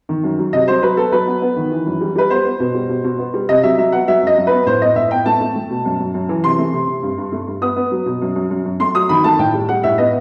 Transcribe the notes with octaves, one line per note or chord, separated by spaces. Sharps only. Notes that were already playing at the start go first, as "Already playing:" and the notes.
D#3
F#2
F#3
C3 D#5
F#3 C5
F#3 B4
B3 A4
F#3 B4
B3
B3
D#3
E3
F#2
G3
G3 B4
B3 C5
B3
B2
G3
B2
B2
B3
G3
C3 D#5
F#3 E5
F#3 E5
B3 F#5
F#3 E5
F#2 D#5
F#2
B3 B4
A2 C5
B3 D#5
A2 E5
B3 G5
A3 A5
A3
A3
B2
F#2
F#2
F#2
E3
C3 C6
A3
C3
C3
G2
G2
A3
G2
B3 D#6
B3
F#3
B2
F#2
F#2
F#2
F#2
A3 C6
F#3 D#6
D#3 B5
A3 A5
A2 G5
G3
G3 F#5
A2 E5
B3 D#5